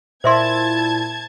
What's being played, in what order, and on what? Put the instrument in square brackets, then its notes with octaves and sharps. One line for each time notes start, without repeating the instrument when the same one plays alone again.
[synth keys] A#2 E4 E7 [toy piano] C5 E5 C6 [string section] A5 G#6